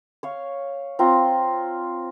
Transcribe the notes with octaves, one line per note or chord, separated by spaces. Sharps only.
C#5 F5
C4 F4 A#5